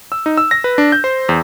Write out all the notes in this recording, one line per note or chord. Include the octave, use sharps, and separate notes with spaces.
E6
D#4
E6
A#6
B4
D4
G6
C5
E2